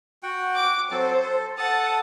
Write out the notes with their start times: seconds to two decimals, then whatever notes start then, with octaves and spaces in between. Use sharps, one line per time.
0.23 F#4 F#5 G5
0.55 D6
0.91 F#3 C4 A4 C5
1.22 A4
1.58 A4 F#5 A5 D#6